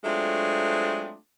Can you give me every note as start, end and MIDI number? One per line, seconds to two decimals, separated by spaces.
0.04 1.15 54
0.04 1.15 56
0.04 1.15 57
0.04 1.15 60
0.04 1.15 62
0.04 1.15 65